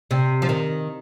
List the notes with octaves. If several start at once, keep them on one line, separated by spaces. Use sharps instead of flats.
C3
F3
D#3